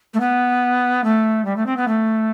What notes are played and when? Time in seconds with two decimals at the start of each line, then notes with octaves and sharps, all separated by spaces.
0.13 A3
0.20 B3
1.04 A3
1.45 G3
1.56 A3
1.66 C4
1.76 B3
1.87 A3